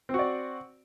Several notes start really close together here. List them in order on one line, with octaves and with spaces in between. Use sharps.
C4 F#4 D5